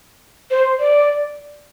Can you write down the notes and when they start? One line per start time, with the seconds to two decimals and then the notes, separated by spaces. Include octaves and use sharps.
0.51 C5
0.80 D5